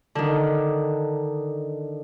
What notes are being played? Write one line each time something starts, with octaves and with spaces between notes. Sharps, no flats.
D3 D#3